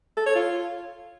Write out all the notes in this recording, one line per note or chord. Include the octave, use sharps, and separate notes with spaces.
A4
C#5
F4